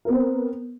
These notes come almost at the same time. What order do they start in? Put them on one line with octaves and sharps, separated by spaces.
A#4 B3 C4